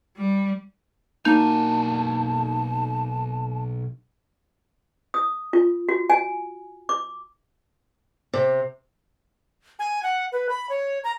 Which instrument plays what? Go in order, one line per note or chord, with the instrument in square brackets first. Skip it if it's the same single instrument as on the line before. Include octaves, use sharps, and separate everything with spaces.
[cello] G3
[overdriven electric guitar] B1 G#5 [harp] A#3 D4 F#4 [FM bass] D#4 [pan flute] A5
[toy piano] D#6
F4
F#4
G#5
D6
[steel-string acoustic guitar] C3
[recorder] G#5
F#5
B4
B5
C#5
A#5